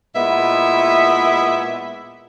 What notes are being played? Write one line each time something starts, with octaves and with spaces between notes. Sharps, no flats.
A#2 G#3 B3 E4 E5